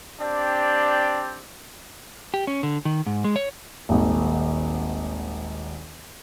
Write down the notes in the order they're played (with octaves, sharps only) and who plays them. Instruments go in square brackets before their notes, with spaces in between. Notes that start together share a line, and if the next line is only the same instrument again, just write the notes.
[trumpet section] C4 D4 G4 D5
[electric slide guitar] G4
C#4
D3
D#3
G#2
G#3
C#5
[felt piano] D#1 G#1